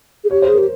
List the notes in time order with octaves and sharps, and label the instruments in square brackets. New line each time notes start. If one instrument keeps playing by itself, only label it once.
[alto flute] G#4
[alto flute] G4 [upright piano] C#5
[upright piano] C5
[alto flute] G#4
[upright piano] A#4
[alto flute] G4